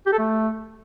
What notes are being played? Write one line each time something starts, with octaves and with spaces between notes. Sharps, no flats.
G4
A4
A3